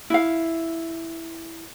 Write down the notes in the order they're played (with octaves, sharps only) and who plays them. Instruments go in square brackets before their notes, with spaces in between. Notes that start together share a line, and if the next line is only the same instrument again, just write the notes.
[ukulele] E4 F5